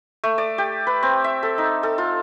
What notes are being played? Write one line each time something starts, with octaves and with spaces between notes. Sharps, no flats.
A3
D5
G4
B4
C4
E5
A4
D#4
A4
F4